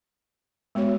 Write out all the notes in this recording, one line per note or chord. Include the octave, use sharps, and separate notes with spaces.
G#3 B3 F#4 C#5